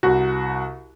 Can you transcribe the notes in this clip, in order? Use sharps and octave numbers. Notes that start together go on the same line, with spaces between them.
C2 F#4